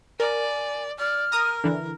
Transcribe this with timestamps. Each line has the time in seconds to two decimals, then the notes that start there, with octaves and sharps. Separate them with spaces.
0.20 A#4 D5 G#5
0.99 D5 F6
1.32 A#4 A#5 D#6
1.64 D3 E3